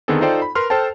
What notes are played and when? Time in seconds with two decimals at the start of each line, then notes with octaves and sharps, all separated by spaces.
0.08 D3 D#3 B3 C4 G#4 A4
0.21 D#4 F4 A4 C5 D5 G5
0.42 B5
0.55 A#4 B4 C6 F6
0.70 A4 C5 G5 A5